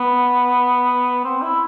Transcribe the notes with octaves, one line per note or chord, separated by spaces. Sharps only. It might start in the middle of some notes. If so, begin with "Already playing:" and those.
Already playing: B3
C4
E4